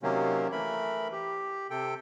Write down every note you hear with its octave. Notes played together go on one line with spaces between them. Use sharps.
C3 D#3 F#3 A#3 C#4
E3 A3 A#4 B5
G4
C3 A4 G5